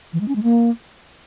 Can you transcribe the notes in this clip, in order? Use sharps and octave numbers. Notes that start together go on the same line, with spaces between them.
E3
G#3
C#4
G#3
A#3